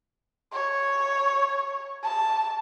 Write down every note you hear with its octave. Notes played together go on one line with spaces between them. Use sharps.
C#5
A5